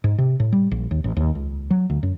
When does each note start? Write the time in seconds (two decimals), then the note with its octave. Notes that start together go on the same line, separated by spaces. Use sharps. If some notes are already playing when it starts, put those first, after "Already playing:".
0.04 G#2
0.18 C3
0.40 A2
0.52 G3
0.71 A#1
0.91 D#2
1.04 A1
1.17 D#2
1.35 C#2
1.70 F#3
1.90 D2
2.03 F#2